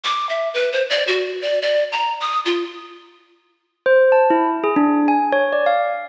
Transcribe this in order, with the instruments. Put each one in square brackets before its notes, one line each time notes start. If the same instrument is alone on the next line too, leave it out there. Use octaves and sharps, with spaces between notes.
[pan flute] D6
E5
B4
C5
D5
F#4
D5
D5
A#5
D#6
F4
[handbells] C5
A5
E4
G#4
D4
G#5
C#5
D5
F5